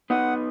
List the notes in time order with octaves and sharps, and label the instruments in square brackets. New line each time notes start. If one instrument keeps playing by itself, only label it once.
[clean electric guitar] B3 D#4 [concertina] F#5